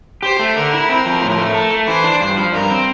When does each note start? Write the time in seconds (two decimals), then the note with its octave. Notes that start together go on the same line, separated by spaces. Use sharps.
0.23 G4 C5
0.39 A3
0.56 D3 A#4
0.73 E4
0.89 C4
1.06 F3
1.22 A2
1.38 A3
1.54 A4
1.71 A3
1.87 E3 C5
2.04 D4
2.21 G2
2.36 F3
2.53 G2 A#4
2.70 C4